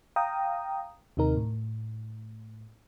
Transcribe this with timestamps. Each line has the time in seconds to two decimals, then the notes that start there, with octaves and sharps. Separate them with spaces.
0.16 F5 G5 A#5 D#6
1.17 D#2 C3 D#4 A#4
1.36 A2